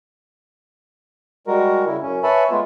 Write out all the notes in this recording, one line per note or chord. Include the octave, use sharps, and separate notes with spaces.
G3 G#3 F#4 A#4
C#3 E4
F#2 C#4
B4 C#5 E5 G#5 A5 B5
G#3 A3 B3 F4